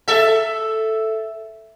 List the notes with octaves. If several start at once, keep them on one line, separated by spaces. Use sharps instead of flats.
A4 E5